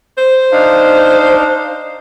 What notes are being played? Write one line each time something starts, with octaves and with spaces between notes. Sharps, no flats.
C5
D4 D#4 F5